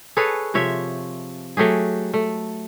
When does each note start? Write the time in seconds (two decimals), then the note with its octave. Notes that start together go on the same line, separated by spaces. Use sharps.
0.17 G#4 A4 B4 C#5
0.54 C3 F3 C#5 E5
1.57 F#3 A3 G4 G#4
2.14 A3